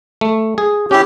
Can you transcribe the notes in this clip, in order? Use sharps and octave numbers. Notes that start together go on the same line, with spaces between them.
A3
G#4
C#4 E4 G4